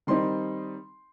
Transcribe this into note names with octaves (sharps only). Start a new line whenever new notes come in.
D#3 G3 C4 D#4 C6